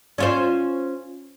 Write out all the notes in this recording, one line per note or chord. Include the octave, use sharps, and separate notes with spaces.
C#4 F4 C5